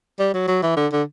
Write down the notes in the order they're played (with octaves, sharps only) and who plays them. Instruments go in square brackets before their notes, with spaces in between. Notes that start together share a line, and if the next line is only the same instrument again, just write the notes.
[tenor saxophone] G3
F#3
F#3
E3
D3
D3